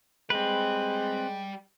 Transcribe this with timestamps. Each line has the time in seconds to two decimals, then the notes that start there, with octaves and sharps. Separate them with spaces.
0.30 G3 G#3 C4 G4 B4